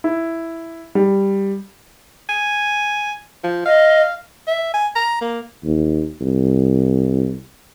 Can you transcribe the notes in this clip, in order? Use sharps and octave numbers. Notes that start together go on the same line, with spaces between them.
E4
G3
G#5
F3
D#5 F5
E5
G#5
A#5
A#3
D#2
C2